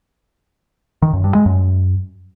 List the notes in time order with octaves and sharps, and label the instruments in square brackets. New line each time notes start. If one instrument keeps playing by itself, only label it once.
[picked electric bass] D#3
F#2
G2
G#3
F#2